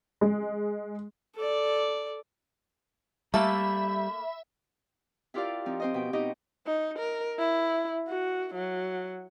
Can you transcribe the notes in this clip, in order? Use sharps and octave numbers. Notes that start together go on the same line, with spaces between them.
G#3
A4 D5
G3 A3 A#3 E5 B5
E4 F4 G4 A#4 D5 F5
F3 C4 D#4
C4 C5 D#5
B2 G5
B2 D#4 G4 D#5 G6
D#4
A#4
E4
F#4
F#3